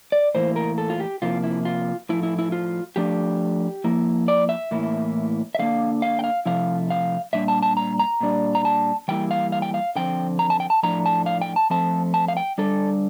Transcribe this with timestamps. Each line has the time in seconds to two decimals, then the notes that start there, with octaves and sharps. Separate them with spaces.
0.12 D5
0.35 A2 E3 A#3 E4 C5
0.56 A#4
0.78 A4
0.90 F4
1.00 G4
1.22 C3 F3 A#3 E4 F4
1.44 E4
1.65 F4
2.09 A2 F3 A3 E4
2.23 E4
2.39 E4
2.52 F4
2.96 F3 A3 D4 G4
3.84 F3 A#3 E4
4.28 D5
4.49 E5
4.71 A2 E3 A#3 E4
5.55 E5
5.59 D3 G3 A#3 D4 F5
6.02 F5
6.19 G5
6.24 F5
6.46 C3 F3 A3 E4 F5
6.90 F5
7.33 A#2 G3 D4 E5
7.48 A5
7.62 A5
7.77 A#5
7.99 A#5
8.21 A#2 G3 D4
8.55 A#5
8.65 A5
9.08 E3 G3 A#3 E4 G5
9.31 F5
9.52 F5
9.62 G5
9.74 F5
9.96 D3 F3 C4 G5
10.39 A#5
10.50 A5
10.60 G5
10.70 A5
10.83 A2 F3 A3 D4 A#5
11.06 A5
11.26 F5
11.41 G5
11.56 A5
11.70 F3 A3 C4 A5
12.14 A5
12.28 F5
12.37 G5
12.58 D3 G3 D4 A4